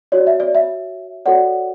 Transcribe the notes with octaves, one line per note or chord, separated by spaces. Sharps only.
F#4 C#5 D5
E5
D5
E5
F#4 A4 C#5 D5 F#5